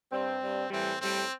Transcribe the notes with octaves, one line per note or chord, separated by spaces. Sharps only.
G2 G3 C4
G2 G3
A2 E3 G3 C4
A2 G3 C4